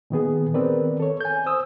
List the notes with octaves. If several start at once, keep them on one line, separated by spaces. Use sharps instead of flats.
A#2 D#3 B3 G#4
D#3 B3 C4 A#4 B4 D5
A4 C#5
G#5 G6
C5 D#6 E6